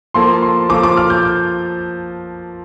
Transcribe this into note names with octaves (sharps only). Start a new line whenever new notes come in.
F3 A#3 F4 A4 C6
C6
F3 A#3 F4 A4 D6
D6
F6
G6